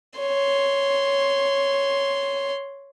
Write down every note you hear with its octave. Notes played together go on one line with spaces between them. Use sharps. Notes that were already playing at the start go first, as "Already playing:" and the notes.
C#5 C6